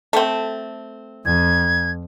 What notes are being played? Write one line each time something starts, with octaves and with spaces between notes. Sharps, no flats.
A3 C4
F2 G#6